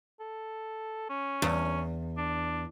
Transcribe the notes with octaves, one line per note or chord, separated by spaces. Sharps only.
A4
C#4
E2
D4